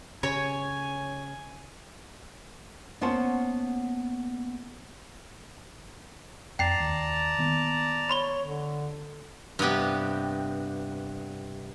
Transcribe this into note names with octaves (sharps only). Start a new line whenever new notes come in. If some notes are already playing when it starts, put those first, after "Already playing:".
C#3 C#5 G#5
A#3 B3 C#4 C5 F#5 A5
F2 D5 G5 A5 A#5 C7
D#2
D#3 A#3 B3
C#5 B5 C6 G7
D3
G2 C3 B3 G4